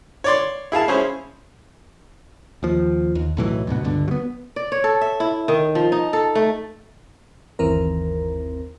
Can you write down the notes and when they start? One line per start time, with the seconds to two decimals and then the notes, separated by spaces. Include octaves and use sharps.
0.24 C#5 D5 C6
0.72 E4 G#4 F5 A5
0.88 C#4 E4 G#4 C5
2.63 D#2 F3
3.15 D#2
3.37 B1 A2 E3 F#3
3.67 D2 G#2 B2 B3
3.84 C#2 G2 D3
4.08 F#3 B3
4.56 D5
4.72 C#5
4.84 A4
5.01 E5
5.20 E4
5.48 D#3
5.75 F3
5.92 D#4
6.13 A4
6.35 A3
7.59 G1 D#2 E3 C4 A#4